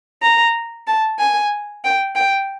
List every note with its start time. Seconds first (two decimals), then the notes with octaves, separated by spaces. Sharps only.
0.22 A#5
0.87 A5
1.19 G#5
1.84 G5
2.15 G5